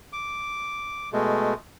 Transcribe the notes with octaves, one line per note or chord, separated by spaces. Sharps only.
D6
B2 G#3 A3